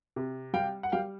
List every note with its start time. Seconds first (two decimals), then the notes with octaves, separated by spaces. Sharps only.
0.16 C3
0.53 G3 F5 G5
0.83 F#5
0.92 G3 F5 G5